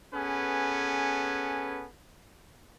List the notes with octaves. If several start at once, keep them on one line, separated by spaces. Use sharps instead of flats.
B3 C#4 G#4 A4 B4